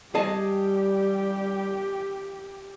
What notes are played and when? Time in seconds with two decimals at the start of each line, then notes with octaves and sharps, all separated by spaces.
0.15 G3 G4 G#4 D#5 A5